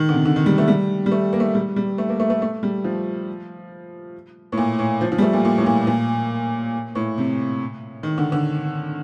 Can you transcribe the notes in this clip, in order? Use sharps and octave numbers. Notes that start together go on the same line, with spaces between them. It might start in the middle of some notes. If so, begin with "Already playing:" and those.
Already playing: D#3
D3
C3
D3
D#3
G3
A3
G3
G3
A3
A#3
A3
G3
G3
A3
A#3
A3
A3
A3
G3
F3
A2
A#2
A2
F3
F3
G3
A3
A#2
A#2
A2
A#2
A#2
A2
C3
D#3
D3
D3